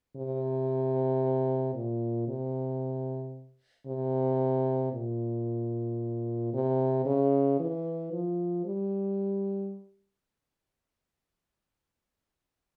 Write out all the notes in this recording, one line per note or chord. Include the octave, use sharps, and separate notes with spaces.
C3
A#2
C3
C3
A#2
C3
C#3
E3
F3
G3